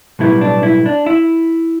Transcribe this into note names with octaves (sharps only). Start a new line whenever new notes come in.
B1 A2 G3 B3 E4
D4
E4
D4
E4